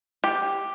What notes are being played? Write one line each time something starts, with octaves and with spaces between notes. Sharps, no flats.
G4